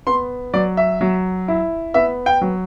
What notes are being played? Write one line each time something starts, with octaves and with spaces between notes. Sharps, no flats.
B3 C6
F#3 D5
E5
F#3
E4
B3 E5
G5
F#3